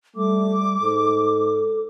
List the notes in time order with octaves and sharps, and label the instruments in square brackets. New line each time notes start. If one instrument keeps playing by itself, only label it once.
[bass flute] G3 [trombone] A3 [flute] D6
[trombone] G#2 [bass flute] A4